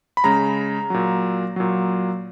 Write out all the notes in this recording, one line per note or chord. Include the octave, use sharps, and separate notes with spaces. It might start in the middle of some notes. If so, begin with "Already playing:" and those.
B5
C#3 G#3 A#5
A#2 F#3
A#2 F#3